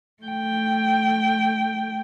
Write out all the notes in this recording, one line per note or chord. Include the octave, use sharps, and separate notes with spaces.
A3 G5